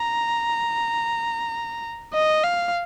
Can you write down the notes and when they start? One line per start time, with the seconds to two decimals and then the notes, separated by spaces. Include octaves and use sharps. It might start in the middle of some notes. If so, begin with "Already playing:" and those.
Already playing: A#5
2.13 D#5
2.44 F5